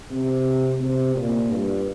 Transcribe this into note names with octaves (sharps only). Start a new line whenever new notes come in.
C3
C3
A#2
G2